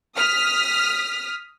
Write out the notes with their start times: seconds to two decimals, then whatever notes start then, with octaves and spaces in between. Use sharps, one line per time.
0.15 D#6 F6 B6